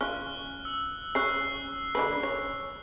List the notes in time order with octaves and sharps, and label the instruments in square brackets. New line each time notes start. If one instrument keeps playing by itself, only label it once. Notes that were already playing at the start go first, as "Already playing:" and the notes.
[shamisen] C#4 F4 [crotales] F6 F#6
[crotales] E6
[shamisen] C#4 C#5 [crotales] F#6 C7
[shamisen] D3 C#4 B4
C#5